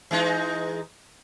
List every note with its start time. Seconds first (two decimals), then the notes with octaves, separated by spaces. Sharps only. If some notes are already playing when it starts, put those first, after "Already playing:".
0.11 E3 G#3 D#4